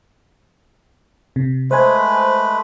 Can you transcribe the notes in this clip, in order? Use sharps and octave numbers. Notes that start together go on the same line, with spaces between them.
C3
G#3 A3 B4 C5 G#5